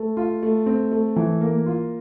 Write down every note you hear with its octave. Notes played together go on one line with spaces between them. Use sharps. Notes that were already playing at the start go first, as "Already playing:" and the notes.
Already playing: A3
F4
A3
C4
A3
E3
A#3
F4